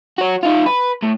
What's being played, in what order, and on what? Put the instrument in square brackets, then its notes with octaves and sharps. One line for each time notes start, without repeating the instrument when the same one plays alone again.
[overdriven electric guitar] F#4 C#5
D#4 F4
B4
A2